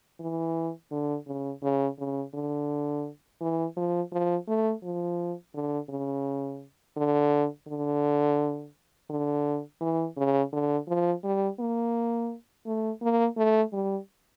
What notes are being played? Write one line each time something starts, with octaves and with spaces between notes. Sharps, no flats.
E3
D3
C#3
C#3
C#3
D3
E3
F3
F3
A3
F3
D3
C#3
D3
D3
D3
E3
C#3
D3
F3
G3
A#3
A3
A#3
A3
G3